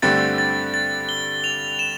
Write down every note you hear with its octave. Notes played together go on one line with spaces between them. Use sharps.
G2 D3 A3 C4 G4 A6
A6
A6
G7
F7
E7